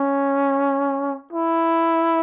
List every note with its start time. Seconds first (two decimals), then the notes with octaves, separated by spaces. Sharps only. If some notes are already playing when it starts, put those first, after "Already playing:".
Already playing: C#4
1.33 E4